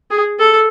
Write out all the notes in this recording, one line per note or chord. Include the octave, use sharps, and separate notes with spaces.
G#4
A4